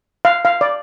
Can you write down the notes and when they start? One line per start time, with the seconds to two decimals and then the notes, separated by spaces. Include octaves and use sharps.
0.25 F5
0.45 F5
0.61 D5